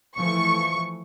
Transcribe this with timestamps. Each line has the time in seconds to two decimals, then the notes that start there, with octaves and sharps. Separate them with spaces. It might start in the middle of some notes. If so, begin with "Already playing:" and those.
0.17 E3 F3 A3 C#6